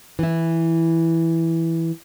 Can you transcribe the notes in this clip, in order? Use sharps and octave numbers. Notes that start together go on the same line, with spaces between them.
E3 E4